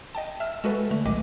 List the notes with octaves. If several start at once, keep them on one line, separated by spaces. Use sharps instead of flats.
D#5 G5 A5
E5 E6 F6
G#3 F#4 A4 B4
D3 A3
B1 A#2 D#3 D#5 D6